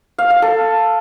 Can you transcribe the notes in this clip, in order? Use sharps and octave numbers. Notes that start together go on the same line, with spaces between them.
F5
F5
A4